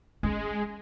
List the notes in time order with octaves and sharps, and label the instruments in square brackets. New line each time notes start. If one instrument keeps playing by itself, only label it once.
[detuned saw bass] G#3 [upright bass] C#4